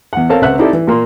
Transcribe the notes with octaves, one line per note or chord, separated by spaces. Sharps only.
E2 F#5
C4 A4 A#4 C#5 F5 A5
C#2 C3 C4 E5 F#5 F#6
C4 D#4 E4 G4 A4 D5
E3
A#2 A#3 C6